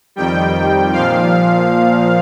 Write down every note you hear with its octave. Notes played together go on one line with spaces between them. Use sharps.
F2 D#3 G3 G5
A#2 F3 F5